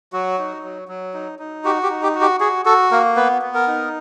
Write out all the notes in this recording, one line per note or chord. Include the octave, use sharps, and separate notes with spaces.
F#3 F#4
D#4
F#3
F#3
D#4
D#4
F#4 G4
G4
D#4
G4
F#4
G4
F#4 G#4
F#4 A4
A#3 A#4
B3 B4
B3
A#4
D#4